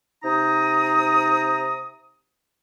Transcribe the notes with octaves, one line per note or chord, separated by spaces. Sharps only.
C3 D#4 A#5 D#6